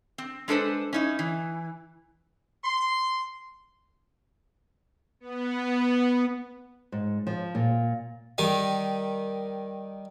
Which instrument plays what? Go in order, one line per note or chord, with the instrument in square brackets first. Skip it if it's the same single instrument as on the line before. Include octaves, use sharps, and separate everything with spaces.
[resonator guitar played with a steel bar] C4
G#3 D4 A4 B4 C5
C#4 D#4 E4
E3
[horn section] C6
[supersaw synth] B3
[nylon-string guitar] G#2
F3
A#2
[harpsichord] D#3 G3 D#4